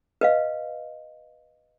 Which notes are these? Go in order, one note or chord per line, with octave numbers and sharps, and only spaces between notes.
B4 D#5 F5